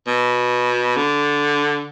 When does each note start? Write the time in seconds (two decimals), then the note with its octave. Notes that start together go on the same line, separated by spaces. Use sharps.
0.07 B2
0.97 D3